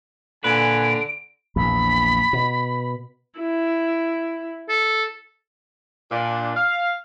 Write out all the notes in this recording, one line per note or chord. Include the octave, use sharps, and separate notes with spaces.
A#2 D3 B4 G#5 D7
A#1 E2 B5
B2
E4
A4
A#2 D4
F5